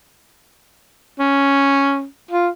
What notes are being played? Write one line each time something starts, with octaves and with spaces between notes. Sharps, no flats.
C#4
F4